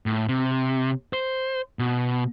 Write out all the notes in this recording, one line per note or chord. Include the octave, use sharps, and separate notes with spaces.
A2
C3
C5
B2